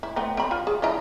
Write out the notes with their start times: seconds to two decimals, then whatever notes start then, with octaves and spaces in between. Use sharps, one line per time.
0.03 E4
0.16 A3 B3 C4
0.37 C4 B5
0.51 F4
0.67 G#4
0.82 F3 D#4 E4